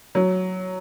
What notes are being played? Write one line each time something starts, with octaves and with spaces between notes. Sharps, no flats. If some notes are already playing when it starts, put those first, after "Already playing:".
F#3